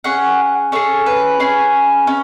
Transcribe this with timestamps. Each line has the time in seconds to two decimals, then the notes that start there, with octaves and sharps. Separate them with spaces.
0.04 C#4 G#4 F#5
0.72 C#4 G#4 A4
1.06 B4
1.40 C#4 G#4
2.07 C#4